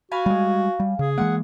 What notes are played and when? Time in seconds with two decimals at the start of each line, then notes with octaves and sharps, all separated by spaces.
0.11 F#4 F5 G#5 B5
0.26 G3 G#3
0.80 G3
0.99 C#3 G#4
1.18 E3 G#3 A#3 F#5